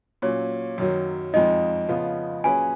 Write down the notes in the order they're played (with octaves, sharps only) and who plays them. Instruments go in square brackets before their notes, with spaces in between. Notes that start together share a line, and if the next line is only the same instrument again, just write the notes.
[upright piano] A#2 F#3 C#4 [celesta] C#5
[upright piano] F#2 D#3 F#3
[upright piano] F2 F3 G#3 D#4 [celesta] D#5
[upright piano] C#3 F3 B3 F4
[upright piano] A#2 F#3 C#4 G#4 B4 [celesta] G#5